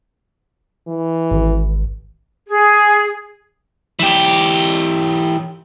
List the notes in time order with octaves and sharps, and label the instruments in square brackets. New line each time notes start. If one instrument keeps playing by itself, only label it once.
[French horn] E3
[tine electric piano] G#1
[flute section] G#4
[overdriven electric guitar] E3 G4